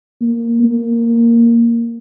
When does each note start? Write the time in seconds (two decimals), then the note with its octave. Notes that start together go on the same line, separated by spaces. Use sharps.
0.21 A#3
0.64 A#3